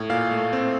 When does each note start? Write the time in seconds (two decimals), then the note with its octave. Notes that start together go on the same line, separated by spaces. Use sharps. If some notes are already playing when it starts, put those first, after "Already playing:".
Already playing: A2
0.10 A#2 F5
0.31 A3
0.53 C4